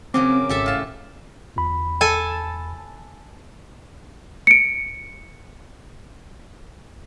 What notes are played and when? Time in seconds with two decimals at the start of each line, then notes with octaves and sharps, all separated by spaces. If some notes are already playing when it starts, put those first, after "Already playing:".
0.14 C#3 F#3 A#3 C4 D6
0.49 G#1 G4 A4 E5
0.66 A2 F5 A5
1.56 G1 E2 B5
2.01 A4 G#5 A5
4.47 C#7 D7